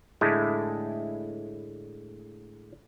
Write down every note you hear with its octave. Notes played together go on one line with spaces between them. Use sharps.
A2 D3 G#3 A3 E4